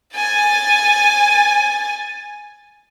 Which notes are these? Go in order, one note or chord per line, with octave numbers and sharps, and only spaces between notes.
G#5 A6